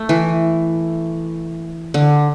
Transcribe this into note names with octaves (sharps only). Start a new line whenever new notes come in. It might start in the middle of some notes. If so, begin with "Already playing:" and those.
Already playing: A3
E3
D3